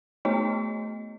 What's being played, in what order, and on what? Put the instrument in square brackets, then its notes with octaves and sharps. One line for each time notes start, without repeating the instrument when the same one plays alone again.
[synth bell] A3 B3 D#4 C#5 D#5